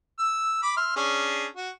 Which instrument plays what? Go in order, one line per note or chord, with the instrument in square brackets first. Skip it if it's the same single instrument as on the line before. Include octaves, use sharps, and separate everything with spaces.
[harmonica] E6
B5 D6
E5 C6 F6
C#4 D4 G#4
F#4